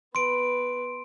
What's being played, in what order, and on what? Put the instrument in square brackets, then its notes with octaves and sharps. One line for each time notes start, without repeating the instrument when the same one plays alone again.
[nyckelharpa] B3 B4 [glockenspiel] C6 D7